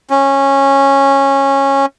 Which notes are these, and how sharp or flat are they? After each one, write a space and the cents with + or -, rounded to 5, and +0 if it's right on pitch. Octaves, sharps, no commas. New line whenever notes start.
C#4 -15